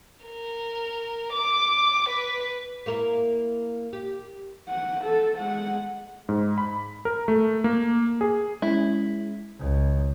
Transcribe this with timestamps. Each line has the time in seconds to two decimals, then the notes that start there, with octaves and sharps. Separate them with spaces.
0.24 A#4
1.33 D6
2.09 B4
2.86 A#3 E4 A#4
3.93 G4
4.68 F#5
5.04 A4
5.38 G#3 F#5
6.29 G#2
6.58 B5
7.05 A#4
7.28 A3
7.64 A#3
8.21 G#4
8.62 G#3 C#4 E4
9.59 C#2